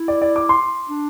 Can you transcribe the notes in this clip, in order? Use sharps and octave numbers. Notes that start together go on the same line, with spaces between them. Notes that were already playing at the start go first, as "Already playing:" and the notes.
Already playing: E4
D5
D5
D6
C6
D4